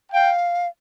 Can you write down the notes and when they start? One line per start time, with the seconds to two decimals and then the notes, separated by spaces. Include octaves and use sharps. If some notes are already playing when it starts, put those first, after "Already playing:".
0.12 F5 G5